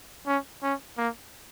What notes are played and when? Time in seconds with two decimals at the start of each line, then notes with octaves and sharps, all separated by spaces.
0.27 C#4
0.63 C#4
0.98 A#3